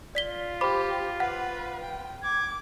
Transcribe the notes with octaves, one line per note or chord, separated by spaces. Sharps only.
F4 D5 B6 G7
G4 C5 B5 D6
B4 F#5
G5
D6 G#6